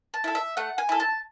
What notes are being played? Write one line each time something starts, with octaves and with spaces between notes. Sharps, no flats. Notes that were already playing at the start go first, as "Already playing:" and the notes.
A5
E4 A4
E5
A3 F#5
G#5
E4 A4
A5